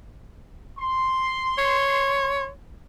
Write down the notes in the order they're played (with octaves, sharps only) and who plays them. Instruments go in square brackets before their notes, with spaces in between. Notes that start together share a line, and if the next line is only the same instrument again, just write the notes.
[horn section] C6
[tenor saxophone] C#5